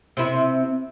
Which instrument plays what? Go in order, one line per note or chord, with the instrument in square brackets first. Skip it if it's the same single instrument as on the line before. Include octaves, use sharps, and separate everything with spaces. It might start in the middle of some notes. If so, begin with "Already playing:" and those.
[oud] C3 E4